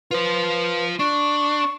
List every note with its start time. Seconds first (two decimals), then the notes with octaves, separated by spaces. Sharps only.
0.11 F4 B4 C5
0.99 D4 C#6